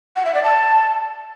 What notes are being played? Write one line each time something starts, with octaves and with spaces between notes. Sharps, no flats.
F#5
E5
D5
A5